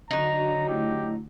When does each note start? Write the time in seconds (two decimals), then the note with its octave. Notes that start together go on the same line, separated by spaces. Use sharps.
0.11 D3 F#3 D4 D#4 F#4 A#5
0.68 A3 E4 G4